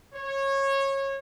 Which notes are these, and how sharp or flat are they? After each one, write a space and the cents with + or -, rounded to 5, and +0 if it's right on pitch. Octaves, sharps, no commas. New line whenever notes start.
C#5 -20